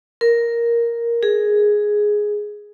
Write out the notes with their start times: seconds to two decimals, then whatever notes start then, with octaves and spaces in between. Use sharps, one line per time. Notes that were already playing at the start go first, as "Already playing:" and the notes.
0.21 A#4
1.23 G#4